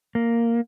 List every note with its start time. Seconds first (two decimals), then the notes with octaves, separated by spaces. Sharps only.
0.15 A#3